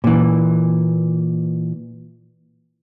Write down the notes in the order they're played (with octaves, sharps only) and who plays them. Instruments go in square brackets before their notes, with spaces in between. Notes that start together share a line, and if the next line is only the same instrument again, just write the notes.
[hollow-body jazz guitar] A#2 E3